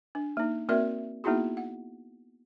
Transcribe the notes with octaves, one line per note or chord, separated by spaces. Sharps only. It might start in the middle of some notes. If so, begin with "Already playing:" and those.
D4
A#3 D#4
A#3 C4 F#4 A#4 D5 E5
A#3 B3 D#4 E4 F#4 G#4
F#5